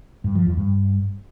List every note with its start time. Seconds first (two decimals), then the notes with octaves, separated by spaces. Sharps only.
0.24 G2
0.35 F3
0.46 E2
0.57 G2